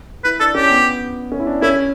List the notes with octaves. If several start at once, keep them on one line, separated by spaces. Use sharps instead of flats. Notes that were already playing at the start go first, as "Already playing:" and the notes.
E4 B4
D4 A4
C#4 G4
B3
C#4
E4
D4
C#4 E4